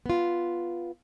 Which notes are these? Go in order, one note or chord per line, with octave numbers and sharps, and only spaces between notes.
B3 F4